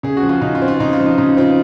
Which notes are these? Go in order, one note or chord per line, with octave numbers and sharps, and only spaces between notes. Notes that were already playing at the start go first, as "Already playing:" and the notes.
C#3 G#4
F#4
F3
F4
C#3 D#4
F4
C4
F4
C#3 D#4
F4
F3
D#4
C#3 D#4
C4 F4